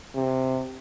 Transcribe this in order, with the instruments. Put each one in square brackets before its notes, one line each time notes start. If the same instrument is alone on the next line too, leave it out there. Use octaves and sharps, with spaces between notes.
[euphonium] C3